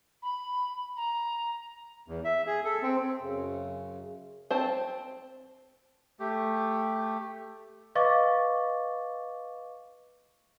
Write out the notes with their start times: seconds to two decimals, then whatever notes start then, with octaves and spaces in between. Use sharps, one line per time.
0.23 B5
0.97 A#5
2.08 E2
2.25 E5
2.47 G#4
2.64 A4
2.83 C4
3.20 F#2 C#3
4.50 C4 C5 A5
6.20 A3 G4
7.95 B4 D#5 F5 C#6 D6 A6